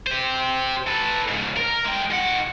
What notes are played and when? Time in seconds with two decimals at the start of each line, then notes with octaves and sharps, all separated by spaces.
0.07 G4 C5
0.87 A4 B4
1.28 G#2 C#3
1.56 A#4
1.85 G#3 G5
2.11 D#3 F#5